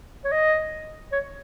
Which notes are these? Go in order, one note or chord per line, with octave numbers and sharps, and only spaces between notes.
C#5
D#5
C#5